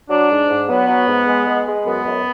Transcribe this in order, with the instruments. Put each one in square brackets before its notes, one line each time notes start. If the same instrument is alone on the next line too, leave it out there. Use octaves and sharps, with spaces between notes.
[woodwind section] F#3 D4
G#2
G#2
F#3 B3
F#3
G#2
G#3
G#3
G#3
F#2 B3
F#2